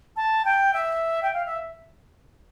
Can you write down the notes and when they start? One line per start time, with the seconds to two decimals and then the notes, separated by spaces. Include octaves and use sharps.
0.17 A5
0.45 G5
0.73 E5
1.23 G5
1.34 F5
1.46 E5